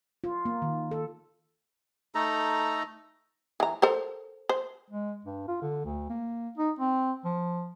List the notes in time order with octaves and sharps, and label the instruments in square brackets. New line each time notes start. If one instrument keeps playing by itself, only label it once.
[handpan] F4
A#3
D#3
A4
[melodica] A3 D#4 A4 A#5
[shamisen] E3 A#5
A4 A#4 C5
C5
[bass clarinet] G#3
G2
F4
D3
D2
A#3
D#4
C4
F3